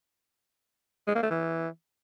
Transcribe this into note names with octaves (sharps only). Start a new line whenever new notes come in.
G#3
A#3
A3
E3